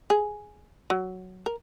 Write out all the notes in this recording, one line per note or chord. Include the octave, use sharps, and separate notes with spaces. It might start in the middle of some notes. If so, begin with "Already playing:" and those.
G#4
F#3
A#4